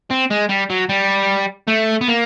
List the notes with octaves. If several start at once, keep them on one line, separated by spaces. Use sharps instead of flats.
C4
G#3
G3
F#3
G3
A3
B3
A#3